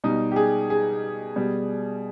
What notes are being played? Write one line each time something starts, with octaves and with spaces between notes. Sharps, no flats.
B2 G3 D#4
G4
G#4
G#4
B2 G3